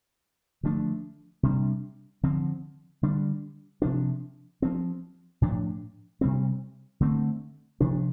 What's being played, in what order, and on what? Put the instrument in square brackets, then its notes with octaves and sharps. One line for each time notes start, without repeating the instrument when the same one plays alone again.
[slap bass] D3 F3 A3 D4
C3 G3 D4
D3 F3 C4
D3 G3 D4
C3 F3 D4
F3 C4
A2 F3 D4
C3 G3 C4
D3 A3 C4
C3 F3 D4